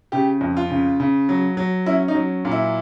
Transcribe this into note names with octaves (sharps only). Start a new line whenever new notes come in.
C#3 G4
F2
F4
C#3
C#3
F#3
F#3
C#4 E4
D#4
F#3
A#2
E4